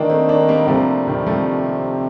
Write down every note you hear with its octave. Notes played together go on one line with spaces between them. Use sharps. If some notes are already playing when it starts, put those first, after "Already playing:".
Already playing: D#3 A#3 D4
A3 C4
A#3 D4
C4
G3 A#3
C3 F3 A3
D#3 G3
F3 A3